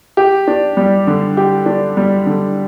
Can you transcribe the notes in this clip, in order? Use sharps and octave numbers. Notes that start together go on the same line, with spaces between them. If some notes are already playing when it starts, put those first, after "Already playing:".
G4
D4
G3
D3
G4
D4
G3
D3